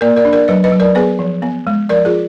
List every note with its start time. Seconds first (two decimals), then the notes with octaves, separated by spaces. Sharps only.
0.01 A#3 A#4 D5
0.16 A#4 D5
0.25 D4
0.33 A#4 D5
0.48 F#3 B4 D#5
0.64 B4 D#5
0.72 F#3
0.80 A#4 D5
0.95 B3 G#4 B4
1.19 F3
1.42 B3
1.67 G#3
1.89 F3 A#4 D5
2.05 F4 G#4